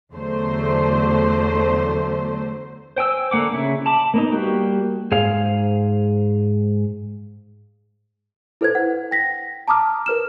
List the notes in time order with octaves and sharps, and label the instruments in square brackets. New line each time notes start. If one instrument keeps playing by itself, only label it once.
[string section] E2 D3 F#3 A3 C5
[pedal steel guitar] C5 G5 G#5 E6
D3 A#3 F#5 D6
C#3 E4
A5 B5 D6
A#3 B3 D#4
G3 A#3 F#4 G4
[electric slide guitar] G#2 G#4 C5 F5
[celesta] E4 A4 B4 C5 G#6
F#5
G5 A#6 B6
A5 A#5 D6 D#6 F6
A#4 B4 F6 E7